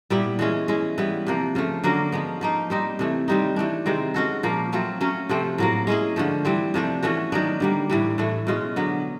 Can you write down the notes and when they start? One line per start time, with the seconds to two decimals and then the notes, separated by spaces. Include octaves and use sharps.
0.10 A#2 G3 B3 E4
0.39 E3 G#3 C#4
0.68 G#3 C#4 E4
0.98 E3 G3 B3
1.27 C3 F3 A#3
1.55 C#3 F3 A3
1.84 D3 F#3 A#3 C#4
2.12 F3 G#3 B3
2.41 F3 A#3 D#4
2.70 G3 C4 D#4
2.99 C3 E3 A3
3.28 D#3 G3 C4 D#4
3.56 E3 A3 D4
3.86 C3 D#3 G#3 C4
4.14 G#3 C#4 F#4 A4
4.43 A#2 F3 A#3
4.72 F#3 A3 C4 F4
5.01 F#3 A3 C#4
5.29 C3 F3 A3 C4
5.58 A2 F#3 A#3
5.87 G#3 C#4 E4 G#4
6.16 D3 F3 A3
6.45 E3 G3 C4
6.74 C3 F3 A3 D4
7.03 E3 A3 C#4 F#4
7.32 D#3 F#3 B3 D4
7.60 D3 G3 A#3
7.90 A2 E3 G3
8.18 A2 E3 A3
8.47 B2 G#3 C#4 F4
8.76 D3 F#3 B3